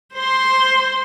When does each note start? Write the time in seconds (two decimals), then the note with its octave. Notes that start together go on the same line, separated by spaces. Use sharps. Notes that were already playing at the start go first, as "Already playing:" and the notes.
0.15 C5 C6